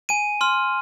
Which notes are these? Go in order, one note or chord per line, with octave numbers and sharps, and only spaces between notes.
G#5 D#7
C6 F6